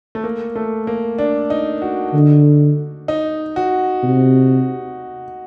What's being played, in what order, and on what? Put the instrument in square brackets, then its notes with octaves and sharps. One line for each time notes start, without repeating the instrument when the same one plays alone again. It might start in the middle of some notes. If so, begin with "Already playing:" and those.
[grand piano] A3
A#3
A3
A#3
D4
D#4
F#4
[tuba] D3
[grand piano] D#4
F#4
[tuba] C3